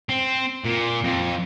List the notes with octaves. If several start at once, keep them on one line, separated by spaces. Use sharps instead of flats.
C4
A#2
F2